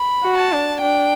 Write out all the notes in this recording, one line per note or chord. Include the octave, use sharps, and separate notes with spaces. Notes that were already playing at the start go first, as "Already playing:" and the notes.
Already playing: B5
F#4
A5
D4
D4 G5